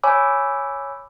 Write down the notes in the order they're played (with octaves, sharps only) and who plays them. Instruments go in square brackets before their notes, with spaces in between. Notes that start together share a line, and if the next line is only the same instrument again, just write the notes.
[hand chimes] C#5 G#5 B5 D6 E6